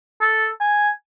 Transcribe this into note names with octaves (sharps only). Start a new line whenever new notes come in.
A4
G#5